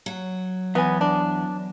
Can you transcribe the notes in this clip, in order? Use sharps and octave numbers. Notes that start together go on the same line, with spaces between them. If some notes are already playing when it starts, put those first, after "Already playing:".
F#3
E2 B3 G#5
D4